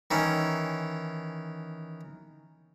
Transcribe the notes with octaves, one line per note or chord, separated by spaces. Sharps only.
D#3 E3 C#4